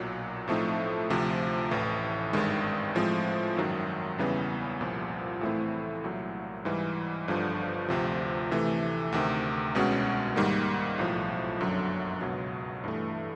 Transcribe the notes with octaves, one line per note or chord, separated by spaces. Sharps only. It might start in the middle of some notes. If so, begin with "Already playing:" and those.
Already playing: B1 A#2 F#3
A2 F3 A3 C4 D#4
D2 C3 F3
A1 A2 E3
G#1 G2 D#3 G#3
A2 F3 G#3 C4
G#1 F#2 D#3 F#3
E2 C#3 E3 G3 B3
C2 A#2 F3
A2 E3 A3 C4 E4
C2 A#2 F#3
G#2 E3 G3
G1 G2 D3 F3
D2 C3 F3
C3 E3 A3
D2 C3 D#3
C2 B2 G#3 C#4 F#4
G#2 D#3 G3 A#3
B1 A2 F3
G1 F#2 D3 F#3
C#2 B2 F#3
G2 E3 A3